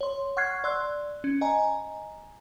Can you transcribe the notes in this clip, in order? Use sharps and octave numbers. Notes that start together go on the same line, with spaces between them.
C#5 C6
F#5 C#6 F6 F#6 G#6 C7
D5 C6 E6 F#6
C#4
D#5 G#5 A#5